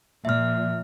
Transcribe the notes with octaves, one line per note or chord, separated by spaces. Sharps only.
A#2 F3 E5 F6